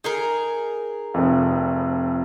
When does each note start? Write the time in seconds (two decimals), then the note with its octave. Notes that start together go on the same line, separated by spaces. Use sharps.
0.04 D#4 G#4 A#4
1.14 F1 F2